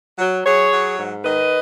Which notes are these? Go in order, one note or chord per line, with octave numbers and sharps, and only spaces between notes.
F#3
F#3 G#4 C#5
F#3
G#2
D#3 B4 D#5